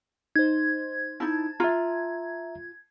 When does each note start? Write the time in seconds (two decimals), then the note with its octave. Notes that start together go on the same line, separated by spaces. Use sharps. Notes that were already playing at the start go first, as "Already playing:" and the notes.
0.36 D#4 C5 G#6
1.20 D#4 E4 A5
1.60 F4 E5 A#5